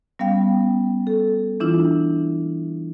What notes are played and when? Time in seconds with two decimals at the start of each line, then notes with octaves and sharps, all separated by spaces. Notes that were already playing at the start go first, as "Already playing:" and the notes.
0.19 G3 B3 C#4 F5 G5
1.07 A4
1.60 E3 D4 E4 F4